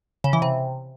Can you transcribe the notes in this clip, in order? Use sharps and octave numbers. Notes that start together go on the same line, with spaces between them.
C#3
E3
C3